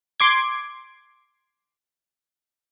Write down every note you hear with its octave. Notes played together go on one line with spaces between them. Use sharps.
C6 D6 G#6